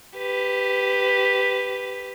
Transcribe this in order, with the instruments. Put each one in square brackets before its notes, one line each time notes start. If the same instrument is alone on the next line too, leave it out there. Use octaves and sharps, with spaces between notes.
[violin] G4 B4